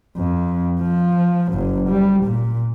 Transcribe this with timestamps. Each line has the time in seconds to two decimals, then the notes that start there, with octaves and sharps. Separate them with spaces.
0.18 F2
0.82 F3
1.51 F#1 F#2
1.88 G3
2.24 A#2